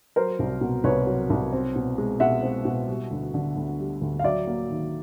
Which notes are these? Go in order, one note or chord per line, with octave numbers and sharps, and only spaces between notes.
F#3 A#4 C5
C2
B2
C2 B4 C#5
F#3
C2
C4
B2
G#3
B2 E5 F#5
C4
B2
G3
D2
D3
D2
G3
D2
F5
F#3 D5 E5
A#3
D#3